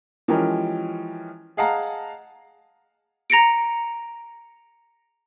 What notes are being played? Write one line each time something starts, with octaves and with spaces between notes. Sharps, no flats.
E3 F3 G#3 C#4 G4 A#4
G#4 D#5 F5 F#5 A5 A#5
A#5 A#6 C#7 D7